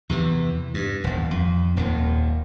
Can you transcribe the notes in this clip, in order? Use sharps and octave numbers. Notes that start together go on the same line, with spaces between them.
E2 C3 E3
G2
D#1 E2
F2
D#1 D#2 D#3